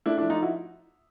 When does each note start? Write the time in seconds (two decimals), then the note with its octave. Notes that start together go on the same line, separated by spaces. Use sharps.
0.06 A3 D4 E4
0.17 D4 E4
0.22 F3
0.30 D#4 F4
0.43 E4 F#4